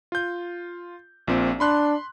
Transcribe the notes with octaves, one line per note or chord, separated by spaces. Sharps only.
F4 G6
A#1 A#2 C4
D4 B5 C6 F#6